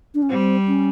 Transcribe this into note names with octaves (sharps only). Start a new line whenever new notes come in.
D4
C#4
G3 C4
C#4